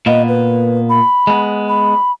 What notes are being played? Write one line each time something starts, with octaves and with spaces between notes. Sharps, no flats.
A#2 A#3 B3 D#5
B4
B5
G#3 B3
B5